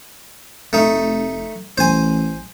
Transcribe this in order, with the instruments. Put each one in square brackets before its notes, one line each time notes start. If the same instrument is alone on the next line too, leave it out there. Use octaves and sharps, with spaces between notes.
[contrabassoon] F1 [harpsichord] A3 D#4
[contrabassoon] A1 [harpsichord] C5 G#5